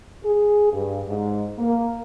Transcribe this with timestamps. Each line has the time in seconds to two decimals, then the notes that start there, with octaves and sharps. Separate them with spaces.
0.24 G#4
0.72 G2
1.08 G#2
1.58 A#3